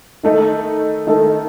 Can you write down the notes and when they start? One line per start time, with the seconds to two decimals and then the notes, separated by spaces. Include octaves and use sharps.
0.23 D#3 A3 D#4 A4
1.07 D#3 A3 D#4 A4